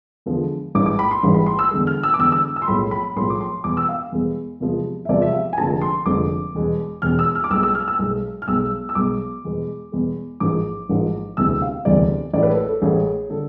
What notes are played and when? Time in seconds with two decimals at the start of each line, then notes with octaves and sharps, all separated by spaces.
0.26 E2 D3 F3 G#3
0.75 A1 G#2 E3 G#3 D6
0.86 D6
0.99 B5
1.11 C6
1.23 A1 G#2 E3 G#3
1.34 B5
1.46 C6
1.59 E6
1.71 E2 D3 G#3
1.87 F6
2.03 E6
2.14 D6
2.19 E2 D3 G#3 E6
2.32 E6
2.56 E6
2.62 C6
2.68 B1 A2 F3 G#3 B5
2.91 B5
3.16 B1 A2 F3 G#3 C6
3.30 D6
3.41 C6
3.64 E2 B2 G#3 D6
3.77 E6
3.89 F5
4.12 E2 B2 G#3
4.60 E2 C3 F3 G#3
5.05 E5
5.09 E2 C3 F3 G#3 D5
5.22 E5
5.33 F5
5.53 G#5
5.58 F1 F2 D3 F3 G#3 A5
5.81 C6
6.06 F1 F2 D3 F3 G#3 D6
6.55 E1 E2 B2 G#3
7.02 E1 E2 B2 G#3 F6
7.19 E6
7.35 F6
7.44 D6
7.50 B1 B2 G#3 E6
7.63 E6
7.75 F6
7.88 E6
7.99 B1 B2 G#3
8.42 F6
8.47 B1 B2 G#3 E6
8.89 E6
8.95 B1 B2 G#3 D6
9.45 E2 B2 G#3
9.92 E2 B2 G#3
10.40 A1 G#2 F3 G#3 D6
10.89 A1 G#2 F3 G#3
11.37 E1 D2 C3 E3 G#3 E6
11.62 F5
11.85 E1 D2 C3 E3 G#3 D5
12.33 A1 A2 G#3 D5
12.43 B4
12.50 A4
12.66 A4
12.82 A1 A2 G#3 G#4
13.30 D3 A4